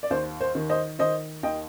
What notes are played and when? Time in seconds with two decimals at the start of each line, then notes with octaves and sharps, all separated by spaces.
0.03 D5
0.11 D#2 C5
0.41 C5
0.55 D#3
0.70 C5 D#5
0.99 D#3 C5 D#5
1.43 D#2 D#5 G5